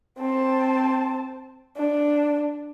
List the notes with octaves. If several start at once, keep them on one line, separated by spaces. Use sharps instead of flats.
C4 A5
D4